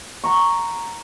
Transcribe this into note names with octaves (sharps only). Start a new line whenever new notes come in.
F#5 A#5 C#6